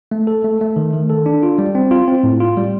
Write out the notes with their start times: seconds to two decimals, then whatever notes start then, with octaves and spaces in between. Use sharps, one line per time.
0.11 A3
0.27 A4
0.44 A3
0.61 A3
0.76 D#3
0.93 D#3
1.10 A4
1.26 D4
1.43 F4
1.58 G3
1.75 C4
1.91 F4
2.08 C4
2.23 A2
2.40 F4
2.57 G3